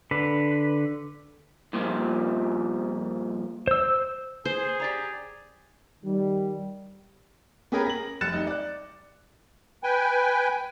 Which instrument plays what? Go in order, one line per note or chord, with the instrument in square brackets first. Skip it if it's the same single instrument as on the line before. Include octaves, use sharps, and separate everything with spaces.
[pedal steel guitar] D3 B4
[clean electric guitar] G2 A#2 F3
[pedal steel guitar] C5 E6
[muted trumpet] G#4 [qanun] C5
[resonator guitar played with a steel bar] G4 D5 A#5
[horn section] D#3 G3
[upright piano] B3 C#4 G4 G#4 A#4 B4
A#6 F#7
F1 F#6 A6 C#7 E7
G3 D#4
D5 F#6
[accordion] B4 G5 G#5